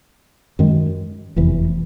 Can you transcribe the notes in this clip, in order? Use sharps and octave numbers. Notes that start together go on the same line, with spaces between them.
F#2 D#3 G#3
F1 E2 C3 E3